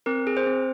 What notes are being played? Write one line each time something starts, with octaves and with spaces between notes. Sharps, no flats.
C4 A#4
G#4
C5
C4